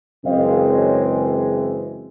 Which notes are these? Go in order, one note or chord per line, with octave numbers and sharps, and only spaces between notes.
F#2 C#3 E3 G#3 C4 D#5 F5
C#5 D#5